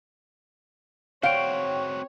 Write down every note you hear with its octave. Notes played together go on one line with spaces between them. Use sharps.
C4 F#4 C#5 F5 G5 D7